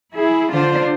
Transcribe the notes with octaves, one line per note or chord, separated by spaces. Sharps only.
E4 G#4
D3 D4 F4 C5